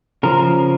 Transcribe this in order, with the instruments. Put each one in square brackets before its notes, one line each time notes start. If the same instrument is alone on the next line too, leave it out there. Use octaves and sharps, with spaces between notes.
[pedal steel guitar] C#3 F3 A#4